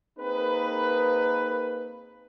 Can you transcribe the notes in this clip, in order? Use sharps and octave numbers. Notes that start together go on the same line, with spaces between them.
A#3 C4 D#4 G#4 A#4 B4